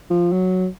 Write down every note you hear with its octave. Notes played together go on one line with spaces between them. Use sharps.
F3
F#3